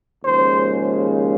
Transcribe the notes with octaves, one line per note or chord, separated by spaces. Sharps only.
D#2 C#3 F3 G#3 C5